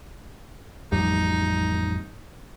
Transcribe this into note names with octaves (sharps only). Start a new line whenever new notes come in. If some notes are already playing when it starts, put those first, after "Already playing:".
A1 F2 G3 D#4